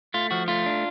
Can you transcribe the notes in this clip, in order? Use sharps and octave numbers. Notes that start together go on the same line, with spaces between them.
A3 F4
F3 F#4
A3 F4
D4